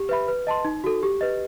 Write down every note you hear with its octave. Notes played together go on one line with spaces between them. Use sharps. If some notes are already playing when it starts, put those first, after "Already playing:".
Already playing: G4
B4 E5 B5
B4
D#5 A5 C6
D#4
F#4 A4
G4
B4 D#5